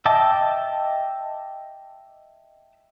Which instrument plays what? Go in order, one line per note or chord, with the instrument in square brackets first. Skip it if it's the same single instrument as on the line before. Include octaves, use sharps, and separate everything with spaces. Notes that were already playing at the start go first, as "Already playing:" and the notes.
[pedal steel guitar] D#5 E5 G5 A5 D6